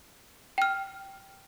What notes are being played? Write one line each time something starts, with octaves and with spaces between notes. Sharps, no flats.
G5 F6